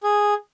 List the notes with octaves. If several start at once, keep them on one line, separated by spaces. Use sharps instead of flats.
G#4